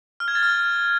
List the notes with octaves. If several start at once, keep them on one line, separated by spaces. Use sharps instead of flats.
F6
G#6
A6
F6